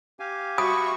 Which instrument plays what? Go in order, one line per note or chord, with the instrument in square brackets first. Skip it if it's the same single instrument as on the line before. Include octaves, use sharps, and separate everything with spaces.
[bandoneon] G4 F5 G#5
[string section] F#4 E5 C#6 [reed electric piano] B5 [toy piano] D#6